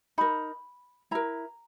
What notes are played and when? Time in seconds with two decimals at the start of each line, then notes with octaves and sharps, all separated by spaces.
0.18 D#4 A#4 B5
1.11 E4 A#4 A#5